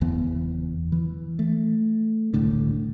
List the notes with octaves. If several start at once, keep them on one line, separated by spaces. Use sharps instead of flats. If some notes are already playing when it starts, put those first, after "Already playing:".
F#1 E2 E3 B3
E3
A3
D#1 C2 A2 D3